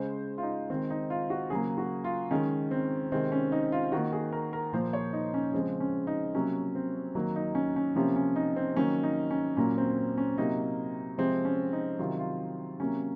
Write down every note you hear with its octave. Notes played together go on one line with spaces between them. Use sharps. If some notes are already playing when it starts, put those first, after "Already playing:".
Already playing: C#3 G#3 C5
F4
D#4
D#3 G#3 C4
D#4
F4
F#4
C#3 F#3 A#3 G#4
F#4
F4
D#3 G#3 C#4
C4
C3 D#3 G#3 C4
C#4
D#4
F4
D#3 A#3 F#4
G#4
A#4
A#4
A#2 F3 A#3 C5
C#5
D#4
C#4
C#3 F3 G#3 C4
C#4
D#4
C3 F#3 A#3 C#4
C4
D#3 F#3 A#3
D#4
C#4
C#4
C3 F3 A#3 C#4
C#4
D#4
C4
D#3 F#3 A#3 C#4
D#4
C#4
A#2 F#3 A#3 C#4
C4
C#4
C3 F#3 A#3 D#4
C3 F3 G#3 C4
C#4
D#4
C3 D#3 F#3 F4
F4
C3 F#3 A#3 C#4